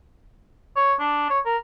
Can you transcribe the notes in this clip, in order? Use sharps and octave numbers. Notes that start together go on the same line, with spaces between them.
C#5
D4
C#5
A#4